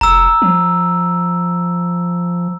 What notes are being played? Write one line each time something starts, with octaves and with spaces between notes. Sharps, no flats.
F1 A#5 E6
F3